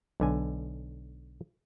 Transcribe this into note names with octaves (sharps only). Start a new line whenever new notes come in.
B1 D3 G#5